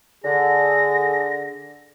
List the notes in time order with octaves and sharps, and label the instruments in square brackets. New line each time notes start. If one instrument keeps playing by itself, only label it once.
[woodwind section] D3 [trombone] G#4 [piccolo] A#6